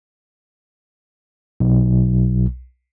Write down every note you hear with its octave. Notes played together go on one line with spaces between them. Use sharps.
B1